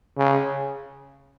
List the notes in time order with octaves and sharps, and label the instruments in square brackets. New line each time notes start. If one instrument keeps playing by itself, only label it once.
[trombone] C#3